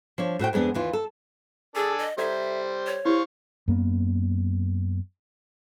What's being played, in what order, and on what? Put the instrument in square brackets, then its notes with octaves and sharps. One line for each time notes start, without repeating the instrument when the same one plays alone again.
[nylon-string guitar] F3 D4 C#5
A2 F#4 C5 G5
F2 G#3 B3 D4
D#2 E3 F4
A4
[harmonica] D4 A4 G#5 [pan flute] G#4
[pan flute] D#5
[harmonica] G3 C5 [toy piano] A4 D5 A#5 [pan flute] E5
[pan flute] C#5
[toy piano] E4 G4 [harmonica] C5 F5 C#6
[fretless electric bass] F#2 A#3 B3